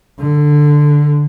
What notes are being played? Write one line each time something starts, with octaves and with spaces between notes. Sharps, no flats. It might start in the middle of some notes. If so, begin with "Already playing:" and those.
D3